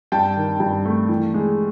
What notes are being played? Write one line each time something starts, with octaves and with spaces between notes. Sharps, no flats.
G2 G5 A5
D#3
G2
A3
E3
G#3